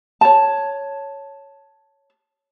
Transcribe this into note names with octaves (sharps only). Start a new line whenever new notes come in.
C#5 A5